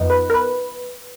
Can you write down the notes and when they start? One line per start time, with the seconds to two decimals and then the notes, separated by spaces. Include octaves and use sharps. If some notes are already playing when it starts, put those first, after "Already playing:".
Already playing: F2 F3 B3 D#4
0.10 B4
0.30 A#4
0.34 B4